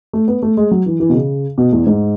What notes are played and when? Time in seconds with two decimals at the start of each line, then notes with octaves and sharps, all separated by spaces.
0.13 A3
0.28 B3
0.43 A3
0.57 G#3
0.71 F#3
0.86 E3
1.00 E3
1.09 B2
1.14 C#3
1.58 B2
1.72 E2
1.87 G#2